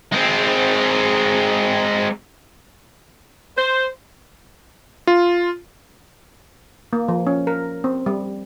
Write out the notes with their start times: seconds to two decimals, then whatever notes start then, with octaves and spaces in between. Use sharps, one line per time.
0.13 G#3 C4
3.57 C5
5.07 F4
6.93 A#3
7.08 F3
7.27 C#4
7.47 A#4
7.84 C4
8.06 G3